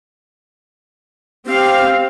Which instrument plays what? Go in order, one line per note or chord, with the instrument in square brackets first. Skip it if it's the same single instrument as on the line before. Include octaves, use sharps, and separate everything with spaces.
[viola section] C4 F5 [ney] G4